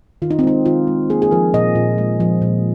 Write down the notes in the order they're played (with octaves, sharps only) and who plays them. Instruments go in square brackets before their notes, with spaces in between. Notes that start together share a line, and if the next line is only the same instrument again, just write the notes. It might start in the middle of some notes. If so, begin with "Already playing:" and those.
[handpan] D#3 F4
D#4
C4
G#3 D#4
D#3 F4
G#3
A#3 G#4
G#4
F3 A#4
A#2 D#5
A#2
G#3
F3
A#2